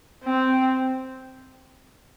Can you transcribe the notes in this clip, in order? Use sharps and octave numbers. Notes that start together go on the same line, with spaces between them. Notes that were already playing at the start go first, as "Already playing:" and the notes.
C4